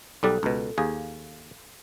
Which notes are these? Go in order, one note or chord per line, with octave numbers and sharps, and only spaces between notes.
B1 G3 A4 C5 D5
C#2 B2
D#2 G#4 F5